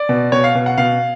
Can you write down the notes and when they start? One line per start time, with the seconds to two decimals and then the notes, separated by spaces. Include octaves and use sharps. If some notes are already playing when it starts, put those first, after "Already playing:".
Already playing: D5
0.09 B2
0.32 B2 C#5
0.44 F5
0.55 B2
0.66 F#5
0.78 B2 F5